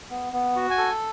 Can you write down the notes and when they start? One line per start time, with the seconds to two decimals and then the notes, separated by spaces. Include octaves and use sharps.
0.10 B3
0.33 B3
0.56 F#4
0.70 G#5
0.78 A4